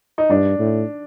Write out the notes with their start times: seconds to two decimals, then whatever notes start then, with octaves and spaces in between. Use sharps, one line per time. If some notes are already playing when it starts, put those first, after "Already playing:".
0.18 D#4
0.30 G2 D4
0.59 A2